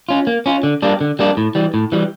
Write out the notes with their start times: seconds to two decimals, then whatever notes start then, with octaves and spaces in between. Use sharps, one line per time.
0.09 C#4 F4
0.27 A#3
0.46 C#4 F4
0.63 D3
0.82 G3 A#3 D4
1.01 D3
1.19 G3 A#3 D4
1.37 A2
1.55 E3 G3
1.74 A2
1.92 E3 G3